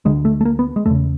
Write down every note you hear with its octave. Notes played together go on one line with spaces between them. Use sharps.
D2 D3 G#3
A3
A3
A#3
B3
G#3
E2 C#3 A3